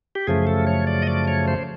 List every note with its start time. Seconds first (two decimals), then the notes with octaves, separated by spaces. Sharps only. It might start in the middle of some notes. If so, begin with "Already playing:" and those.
0.15 G4
0.27 F#2 C#3 F3 A3 G#4
0.47 A4
0.67 C#5
0.87 D5
1.02 D#5
1.07 D5
1.28 C#5
1.48 C5